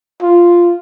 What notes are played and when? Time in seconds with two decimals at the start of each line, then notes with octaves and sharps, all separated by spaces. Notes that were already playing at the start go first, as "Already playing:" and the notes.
0.22 F4